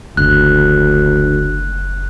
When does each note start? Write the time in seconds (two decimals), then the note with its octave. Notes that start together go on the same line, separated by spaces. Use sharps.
0.17 F#1 D2 F#6